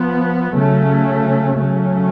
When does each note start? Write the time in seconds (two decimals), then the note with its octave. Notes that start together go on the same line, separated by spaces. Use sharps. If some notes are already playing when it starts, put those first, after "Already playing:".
Already playing: F3 B3
0.54 C#3 F#3 A3 C#4
1.58 C#3 F#3 A3 C#4